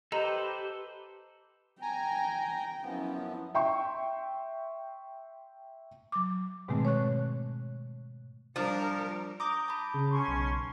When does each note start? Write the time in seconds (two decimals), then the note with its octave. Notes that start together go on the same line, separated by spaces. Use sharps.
0.12 G4 A4 B4 C5 D#5 A#5
1.82 G5 G#5 A#5
2.84 F#2 F3 B3 C#4 E4
3.55 E5 G5 C6 C#6
6.12 F#3 D6
6.68 G#2 B2 D#3 G#3 A3 C4
6.85 C#5 C#6 F#6
8.56 F3 G3 D4 A#4
9.40 A#5 D6 D#6 G6
9.68 A5 B5
9.94 C#3
10.10 C#4 C6 C#6
10.28 B1